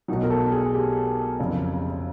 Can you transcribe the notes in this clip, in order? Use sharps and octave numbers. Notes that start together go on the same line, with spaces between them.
B1 B2 F#3 D#4
A#4
A4
G#4
G4
F#1 F2 C#3